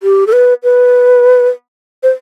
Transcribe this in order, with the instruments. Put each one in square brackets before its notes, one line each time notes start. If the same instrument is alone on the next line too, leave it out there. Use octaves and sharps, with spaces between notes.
[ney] G4
A4
B4
B4
C5